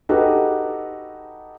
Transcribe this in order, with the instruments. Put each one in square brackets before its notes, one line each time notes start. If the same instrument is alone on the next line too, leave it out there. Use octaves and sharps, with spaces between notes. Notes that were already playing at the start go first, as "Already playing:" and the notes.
[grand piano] D#4 F#4 G4 A4 B4